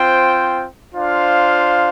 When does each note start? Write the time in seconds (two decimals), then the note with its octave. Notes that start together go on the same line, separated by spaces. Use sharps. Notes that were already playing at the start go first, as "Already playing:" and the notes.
Already playing: C4 F4 C5 G5
0.93 D4 F4 C5 F5